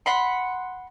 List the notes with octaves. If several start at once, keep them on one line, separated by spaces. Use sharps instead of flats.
F#5 B5 C6